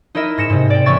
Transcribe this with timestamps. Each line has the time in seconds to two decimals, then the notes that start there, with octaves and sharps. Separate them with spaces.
0.15 D#4 E4 A#4 D#5 E5
0.38 G#2 A#6 C#7 E7
0.50 G#2 C3
0.70 D5 G5
0.86 A1 B3 C#5 E5 C#6 A6